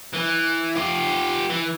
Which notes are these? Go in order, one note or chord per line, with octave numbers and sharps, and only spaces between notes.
E3
F4 G4
E3